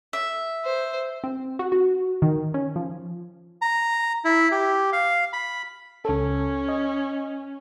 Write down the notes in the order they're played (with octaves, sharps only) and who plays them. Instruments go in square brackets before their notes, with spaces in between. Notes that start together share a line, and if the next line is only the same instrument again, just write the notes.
[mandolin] E5
[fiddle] C5
[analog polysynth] C4
F#4
F#4
D#3
C#4
F3
[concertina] A#5
E4
G4
F5
B5
[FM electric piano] C#2 A4 [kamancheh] C#4
[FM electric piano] D#5